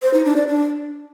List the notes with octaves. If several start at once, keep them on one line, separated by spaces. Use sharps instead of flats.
C5
D#4
D4
D5
D4